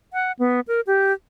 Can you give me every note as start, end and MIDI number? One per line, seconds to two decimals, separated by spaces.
0.13 0.32 78
0.39 0.60 59
0.68 0.81 70
0.87 1.13 67